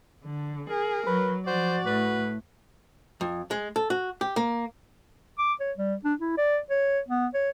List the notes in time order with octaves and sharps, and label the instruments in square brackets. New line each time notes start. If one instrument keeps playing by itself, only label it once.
[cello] D3
[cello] G#4 [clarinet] A#4
[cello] F#3 [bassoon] B4
[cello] F3 D5 [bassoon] F#4 [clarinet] C5
[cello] A2 [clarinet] B4
[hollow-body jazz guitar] F2
G#3
A4
F#4
G4
A#3
[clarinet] D6
C#5
G3
D4
E4
D5
C#5
B3
C#5